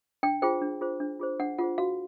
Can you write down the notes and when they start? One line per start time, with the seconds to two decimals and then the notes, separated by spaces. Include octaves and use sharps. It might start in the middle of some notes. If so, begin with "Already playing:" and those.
0.23 D4 G5
0.42 F4 G#4 C5 G5
0.62 D4
0.81 F4 G#4 C5
1.00 D4
1.19 F4 G#4 C5
1.40 D4 F#5
1.59 F4 G#4 C5 F#5
1.78 F#4 F5